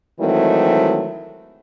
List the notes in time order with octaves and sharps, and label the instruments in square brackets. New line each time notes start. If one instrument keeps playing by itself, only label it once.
[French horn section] D#3 E3 F#3 G#3 A3 C4